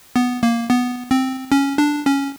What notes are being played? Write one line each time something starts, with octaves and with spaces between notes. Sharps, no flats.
B3
A#3
B3
C4
C#4
D4
C#4